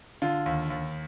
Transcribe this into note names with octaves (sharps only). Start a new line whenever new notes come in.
D3 F4
D#2
D#2